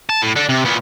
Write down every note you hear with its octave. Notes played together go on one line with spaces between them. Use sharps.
A5
A2
D4 A4
C3
A#2 B3